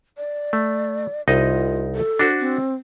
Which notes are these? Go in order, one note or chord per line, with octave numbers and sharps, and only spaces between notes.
D5
A3
C2 D#4 F4 D#5
A4
D4 F#4 C5
C4